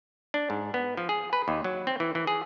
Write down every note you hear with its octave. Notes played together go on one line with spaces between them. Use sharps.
D4
G#2
B3
F3
G#4
B4
D#2
F#3
C4
E3
E3
G#4